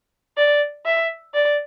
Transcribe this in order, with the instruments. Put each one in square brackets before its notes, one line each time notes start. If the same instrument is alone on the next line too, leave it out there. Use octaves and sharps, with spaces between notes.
[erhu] D5
E5
D5